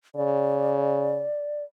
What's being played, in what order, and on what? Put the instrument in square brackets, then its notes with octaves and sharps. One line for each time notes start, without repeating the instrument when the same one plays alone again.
[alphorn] C#3 [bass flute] D5